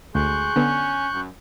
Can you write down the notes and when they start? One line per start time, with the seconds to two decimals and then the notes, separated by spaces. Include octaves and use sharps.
0.15 D2 G#3 C#6 F#6 G6
0.56 D3 B3 C#4
1.14 F#2